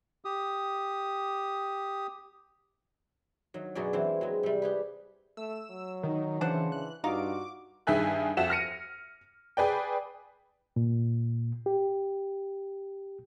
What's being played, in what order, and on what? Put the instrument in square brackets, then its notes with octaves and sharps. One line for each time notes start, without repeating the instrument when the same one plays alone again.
[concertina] G4 D#6
[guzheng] D#3 F#3
F#2 B2 F#3 C#4 G#4 D5
E3 G#3 C4 E4
F#3 G#3
C3 G3
G4 G#4 B4
[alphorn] A3 [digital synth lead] E6
[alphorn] F#3
[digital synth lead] D#3 [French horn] D#4
[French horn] C#3 [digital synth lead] E3 [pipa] D4 C5 F#5
[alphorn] E3 [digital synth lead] F#6
[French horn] G2 [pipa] D#4 F4 F5 [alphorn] F#4 [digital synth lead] D6
[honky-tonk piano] G2 D#3 G#4 E5 G#5 F#6
F2 F#4 E5 E7
F6 A#6 C#7 D#7
G#4 B4 D5 G5
[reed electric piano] A#2
G4